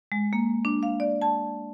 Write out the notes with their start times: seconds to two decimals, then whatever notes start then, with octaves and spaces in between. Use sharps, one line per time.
0.12 G#3
0.33 A#3
0.65 D4
0.83 F5
1.00 D5
1.22 A5